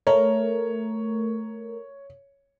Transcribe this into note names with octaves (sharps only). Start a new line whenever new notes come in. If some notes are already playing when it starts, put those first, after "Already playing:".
A3 A#4 C#5